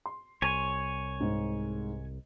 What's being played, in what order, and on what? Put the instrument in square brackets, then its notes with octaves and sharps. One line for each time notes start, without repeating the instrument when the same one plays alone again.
[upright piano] C6
[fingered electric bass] C2 [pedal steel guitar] C#5 G#5
[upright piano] G#2